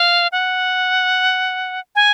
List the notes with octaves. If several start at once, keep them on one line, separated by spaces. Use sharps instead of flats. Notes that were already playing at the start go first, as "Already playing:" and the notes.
Already playing: F5
F#5
G#5